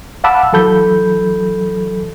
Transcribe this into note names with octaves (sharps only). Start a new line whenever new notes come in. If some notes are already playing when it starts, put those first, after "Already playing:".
F5 F#5 A5 B5 D6 E6
E3 F#3 A4 B5 G6